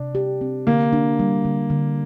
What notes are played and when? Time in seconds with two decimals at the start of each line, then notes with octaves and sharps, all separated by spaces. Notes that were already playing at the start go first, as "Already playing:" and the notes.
Already playing: C3 D4
0.15 G4
0.41 C4
0.67 D3 A#3
0.93 D4
1.19 G3
1.45 D3
1.70 D3